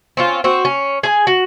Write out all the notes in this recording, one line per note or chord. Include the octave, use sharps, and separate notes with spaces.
C4 C#4 F4
C4 F#4
C#4
G#4 G#5
F#4